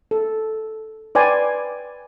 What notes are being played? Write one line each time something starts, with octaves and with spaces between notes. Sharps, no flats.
A4
B4 D5 G5 G#5 C6